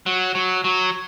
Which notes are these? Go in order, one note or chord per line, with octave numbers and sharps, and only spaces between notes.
F#3
F#3
F#3